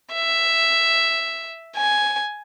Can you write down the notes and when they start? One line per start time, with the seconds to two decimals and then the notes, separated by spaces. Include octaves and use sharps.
0.13 E5
1.77 G#5